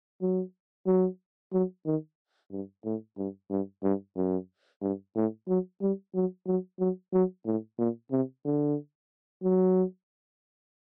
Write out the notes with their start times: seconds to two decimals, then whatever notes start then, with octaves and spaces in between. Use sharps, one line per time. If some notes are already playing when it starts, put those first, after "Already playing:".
0.21 F#3
0.86 F#3
1.53 F#3
1.86 D#3
2.51 G2
2.85 A2
3.18 G2
3.50 G2
3.83 G2
4.16 F#2
4.82 G2
5.16 A2
5.48 F#3
5.81 G3
6.14 F#3
6.47 F#3
6.79 F#3
7.13 F#3
7.46 A2
7.78 A#2
8.11 C3
8.45 D3
9.43 F#3